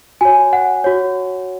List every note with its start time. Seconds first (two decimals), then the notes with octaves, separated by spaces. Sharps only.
0.21 F#4 C#5 G#5
0.53 F#5
0.84 F#4 C#5